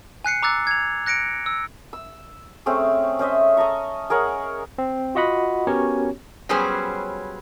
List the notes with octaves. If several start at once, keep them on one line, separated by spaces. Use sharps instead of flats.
G#5 F#6 C7 C#7
A#5 D6 E6 F#6 A6
G#6 F7
F#6 A#6 C#7 D7
E6
E6
A3 C4 C#4 G#4
C#4 C5 D#5 E5
D#5 A5 A#5 C#6
G#4 A#4 C#5 F#5
C4
F4 F#4 D#5 F#5 B5
B3 C#4 F#4 G4 A#4 C#5
F#3 G3 B3 C#4 G#4 C5